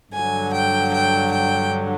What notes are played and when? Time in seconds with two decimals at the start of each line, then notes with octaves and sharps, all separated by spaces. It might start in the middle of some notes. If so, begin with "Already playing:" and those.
0.13 G2 D3 F#3 G#5
0.53 G5
0.93 G5
1.32 G5